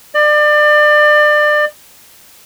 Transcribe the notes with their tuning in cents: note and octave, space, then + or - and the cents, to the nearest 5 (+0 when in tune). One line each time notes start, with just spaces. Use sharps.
D5 +30